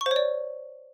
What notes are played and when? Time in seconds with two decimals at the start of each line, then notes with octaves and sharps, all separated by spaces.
0.01 C#6
0.06 C5
0.11 C#5
0.16 D5